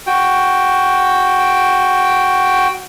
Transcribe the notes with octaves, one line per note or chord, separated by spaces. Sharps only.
F#4 G5